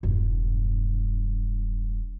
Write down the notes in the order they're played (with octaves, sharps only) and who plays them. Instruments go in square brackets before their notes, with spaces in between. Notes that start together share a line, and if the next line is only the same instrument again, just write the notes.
[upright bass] E1 G2